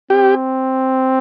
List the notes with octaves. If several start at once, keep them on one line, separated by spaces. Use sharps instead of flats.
C4 G4